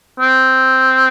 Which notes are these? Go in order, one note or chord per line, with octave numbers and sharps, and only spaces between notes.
C4